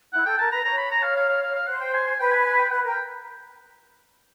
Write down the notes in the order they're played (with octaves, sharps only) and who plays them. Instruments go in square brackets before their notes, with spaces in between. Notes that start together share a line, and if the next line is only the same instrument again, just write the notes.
[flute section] E4 [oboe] F#5
[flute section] A4 [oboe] G5
[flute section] A#4 [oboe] A5
[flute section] B4 [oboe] A#5
[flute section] C#5 [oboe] A#5
[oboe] B5
A#5
F5
F5
F5
F5
F5
[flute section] C5 [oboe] F#5
[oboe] G5
G#5
G#5
[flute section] B4 [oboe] G5
[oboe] G#5
G#5
G5
[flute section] B4 [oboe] F#5
[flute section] A#4 [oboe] G5